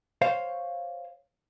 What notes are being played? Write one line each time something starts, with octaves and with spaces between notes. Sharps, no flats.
C5 C#5 F5